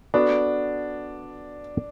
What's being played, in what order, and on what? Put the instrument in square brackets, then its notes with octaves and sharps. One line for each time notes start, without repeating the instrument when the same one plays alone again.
[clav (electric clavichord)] B3 F#4 A4 [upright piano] D4